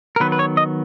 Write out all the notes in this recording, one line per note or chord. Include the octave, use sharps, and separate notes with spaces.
A#4
D#3 F#3 B3 B4
B4
C#5
D#5